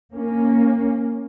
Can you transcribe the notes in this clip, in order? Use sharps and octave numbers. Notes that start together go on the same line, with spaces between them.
A#3 C#4